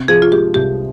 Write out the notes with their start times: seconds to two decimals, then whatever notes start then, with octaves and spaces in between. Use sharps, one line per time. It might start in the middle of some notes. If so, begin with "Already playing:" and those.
Already playing: C3
0.08 F3 G#4
0.22 F4
0.32 G#3 G4
0.54 C2 G4